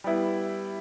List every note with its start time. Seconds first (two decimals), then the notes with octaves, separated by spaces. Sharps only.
0.04 G3 B3 E4